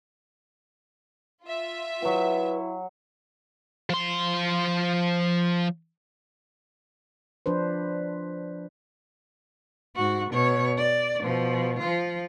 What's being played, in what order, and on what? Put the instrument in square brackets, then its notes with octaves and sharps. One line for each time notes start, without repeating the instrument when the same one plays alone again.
[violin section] F4 E5
[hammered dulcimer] F#3 G5 [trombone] E4 [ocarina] B4
[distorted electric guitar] F3 C6
[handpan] F3 D4 B4 C5
[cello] G#2 F#4
B2 C#5
D5
B2 F3
F3 F4